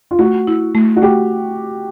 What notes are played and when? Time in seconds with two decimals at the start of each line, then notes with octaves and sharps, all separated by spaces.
0.11 F4
0.19 A3 F#4
0.47 E4
0.75 A3
0.96 F#4
1.02 A3 G4